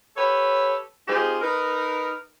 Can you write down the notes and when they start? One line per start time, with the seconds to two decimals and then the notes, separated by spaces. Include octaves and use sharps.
0.17 G4 A4 B4 C#5
1.08 C4 D#4 F4 G4 G#4 C5
1.42 D#4 A#4 B4